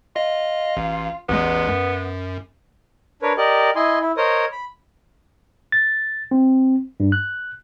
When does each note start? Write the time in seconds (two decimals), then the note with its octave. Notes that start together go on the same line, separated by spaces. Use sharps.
0.16 F4 D#5
0.77 A1
1.29 A1 E2 G#3 B3
1.68 F#2
3.22 D4 A#4 B4 C#5
3.37 G4 A#4 D5 D#5
3.76 E4 D#5 G#5 C6
4.01 E4
4.17 A#4 C5 C#5 D#5 D#6
4.52 B5
5.72 A6
6.31 C4
7.00 G2
7.12 F#6